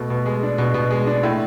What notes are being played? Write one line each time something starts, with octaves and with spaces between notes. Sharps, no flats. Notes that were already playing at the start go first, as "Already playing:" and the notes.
Already playing: B2 A3
B2
G#3
D4
B2
B2
G#3
D4
A2